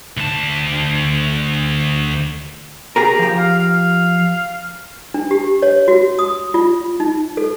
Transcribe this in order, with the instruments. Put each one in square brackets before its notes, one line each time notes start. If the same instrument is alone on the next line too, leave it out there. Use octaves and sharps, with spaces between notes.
[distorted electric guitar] D2 A5
[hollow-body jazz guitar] G4 G#4 A#4 [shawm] A#5
[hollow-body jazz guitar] F3 G4
[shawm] F5
F5
[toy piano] D4
G4
C#5
F#4
D#6
F4
D#4
A4